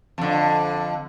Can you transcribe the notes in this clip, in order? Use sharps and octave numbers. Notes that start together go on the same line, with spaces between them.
F2 D3